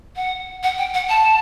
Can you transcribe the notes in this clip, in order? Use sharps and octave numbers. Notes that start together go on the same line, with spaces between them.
F#5
F#5
G5
F#5
A5